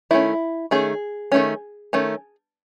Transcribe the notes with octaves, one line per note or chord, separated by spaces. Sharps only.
D#3 A3 C#4 E4
D#3 A3 C#4 G#4
D#3 A3 C#4
D#3 A3 C#4